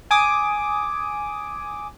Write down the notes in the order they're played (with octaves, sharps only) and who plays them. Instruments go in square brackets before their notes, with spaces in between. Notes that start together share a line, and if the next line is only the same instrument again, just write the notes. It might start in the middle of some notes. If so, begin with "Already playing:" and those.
[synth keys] G#5 D6 D#6